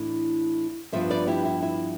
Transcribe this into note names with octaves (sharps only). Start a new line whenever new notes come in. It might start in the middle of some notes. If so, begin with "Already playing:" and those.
Already playing: A2 E3 D4
G2 F3 B3 D4 C5 E5
B4 D5
E4 G4
E4
E4